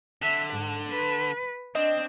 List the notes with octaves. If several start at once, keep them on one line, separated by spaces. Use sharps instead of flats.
D3 E5
G#2
B4
C4 D4 D#5